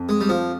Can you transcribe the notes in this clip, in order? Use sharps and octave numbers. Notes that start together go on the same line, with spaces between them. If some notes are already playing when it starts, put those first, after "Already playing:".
Already playing: F2
G#3
G3
F3